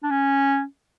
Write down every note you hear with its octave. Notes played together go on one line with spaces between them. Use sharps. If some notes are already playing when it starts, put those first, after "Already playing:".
D4
C#4